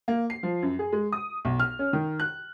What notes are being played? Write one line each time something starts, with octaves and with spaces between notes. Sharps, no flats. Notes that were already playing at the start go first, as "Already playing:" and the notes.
A#3
C7
F3
F#2
G#4
G#3
D#6
B1
F6
C#4
D#3
F#6